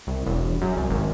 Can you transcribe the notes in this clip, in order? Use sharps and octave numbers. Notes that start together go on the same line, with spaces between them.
C2
E1
F#2
C2
G#1